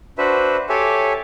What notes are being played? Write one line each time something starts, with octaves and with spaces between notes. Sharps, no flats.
D4 F#4 B4 C5 E5
G4 A4 C#5 E5 G#5